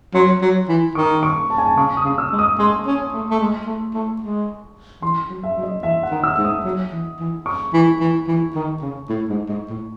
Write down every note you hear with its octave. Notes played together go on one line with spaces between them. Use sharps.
F#3 C6
F#3
E3
D#3 C#6
C#6
A5
G#5
A5
C#3 C#6
D#6
C#3
E6
G#3
D#6
G#3 C6
C#4
A3
A3
G#3
A3
A3
G#3
E3 C6
F#3
E5
F#3
D#5
E3 E5
F#5
D#3
E6
G#2
D#6
F#3
E3
E3
C#6
E3
E3
E3
D#3
C#3
A2
G#2
G#2
A2